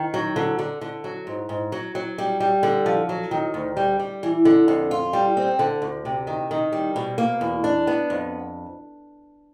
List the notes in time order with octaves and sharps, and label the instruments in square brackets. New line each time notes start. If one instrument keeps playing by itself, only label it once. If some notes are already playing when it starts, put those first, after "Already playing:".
Already playing: [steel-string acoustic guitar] D#3
F#3
D3
D3
D3
F#3
G#2
G#2
F#3
F#3
G3
G3
D3
F3
F#3
D#3
D2
G3
G3
E3
D3
F2
F4
G3
C4
D3
D2
C3
D#3
D#3
G3
B2
A#3
E2
D4
B3
F2